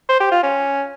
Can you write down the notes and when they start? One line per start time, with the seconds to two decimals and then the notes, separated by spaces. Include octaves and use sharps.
0.09 C5
0.20 G4
0.32 F4
0.43 C#4